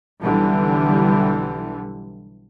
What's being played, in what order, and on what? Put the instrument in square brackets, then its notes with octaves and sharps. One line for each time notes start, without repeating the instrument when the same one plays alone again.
[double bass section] B1 D3 E3 G3